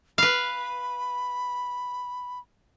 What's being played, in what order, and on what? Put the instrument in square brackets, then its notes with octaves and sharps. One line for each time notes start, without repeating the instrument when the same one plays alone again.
[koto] B4 F5 [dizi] B5